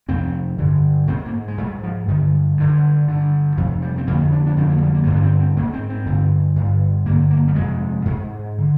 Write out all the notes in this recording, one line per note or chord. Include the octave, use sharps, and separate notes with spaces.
F2 C3 C4
G2 D3
G#2 C4
A#3
G#3
G#2 G3
F3
G2 D3 D#3
G2 D3
G2 D3
F2 C3 F3
G3
C4
F2 D3 A#3
D4
D4
F2 D3 C4
A#3
F3
G3
A#3
G2 D3 A#3
D4
C4
C4
G#2 A#3
C4
C4
G2 D3
G2 D3
G2 D3 A#3
A#3
G3
F2 C3 G#3
G#2
D3